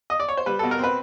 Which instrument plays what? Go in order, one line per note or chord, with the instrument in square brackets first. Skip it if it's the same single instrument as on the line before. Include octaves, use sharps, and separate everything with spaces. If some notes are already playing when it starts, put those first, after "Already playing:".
[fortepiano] D#5
D5
C#5
C5
G3 B4
B2 A4
A#4
C4 B4